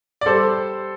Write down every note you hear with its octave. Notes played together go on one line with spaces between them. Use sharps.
D5
G3 A4 C5